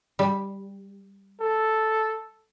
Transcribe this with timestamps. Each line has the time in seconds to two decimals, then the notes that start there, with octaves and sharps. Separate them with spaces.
0.19 G3
1.41 A4